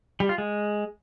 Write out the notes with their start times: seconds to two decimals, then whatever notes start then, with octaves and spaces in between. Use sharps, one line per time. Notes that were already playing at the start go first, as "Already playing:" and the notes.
0.20 G3
0.29 F4
0.38 G#3